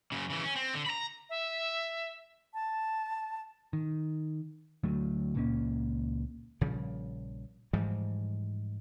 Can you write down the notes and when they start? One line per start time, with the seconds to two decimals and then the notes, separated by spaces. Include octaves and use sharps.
0.12 F#2 C#3
0.30 C#3 E3
0.43 C#4
0.56 C4
0.75 D3
0.86 A#5 B5
1.30 E5
2.54 A5
3.73 D#3
4.84 D2 F#3 A3
5.35 C#2 A#2 A#3 C#4
6.61 A#1 C#3 F3 G3
7.73 G#2 E3 F3 G3